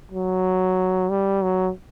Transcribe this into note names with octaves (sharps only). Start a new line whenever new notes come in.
F#3
G3
F#3